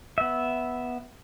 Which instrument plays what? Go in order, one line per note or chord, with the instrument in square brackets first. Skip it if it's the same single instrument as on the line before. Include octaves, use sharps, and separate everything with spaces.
[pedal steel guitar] B3 E5